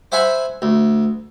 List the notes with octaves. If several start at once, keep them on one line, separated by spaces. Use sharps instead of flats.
C5 E5 F#5 G#5 B5
D2